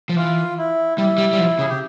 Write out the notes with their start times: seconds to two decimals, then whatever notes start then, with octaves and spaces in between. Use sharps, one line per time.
0.09 F3
0.16 E3 F4
0.58 E4
0.98 G3 E4
1.18 G3
1.33 G3
1.38 F3
1.59 C#3 G#4
1.69 G4